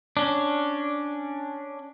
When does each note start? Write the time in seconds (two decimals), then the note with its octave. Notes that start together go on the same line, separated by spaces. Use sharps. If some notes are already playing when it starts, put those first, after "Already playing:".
0.17 C#4 D4